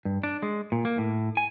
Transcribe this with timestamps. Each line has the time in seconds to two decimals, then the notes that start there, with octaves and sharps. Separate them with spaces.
0.05 G2
0.23 D4
0.42 G#3
0.72 A#2
0.85 A#3
0.98 A2
1.37 G#5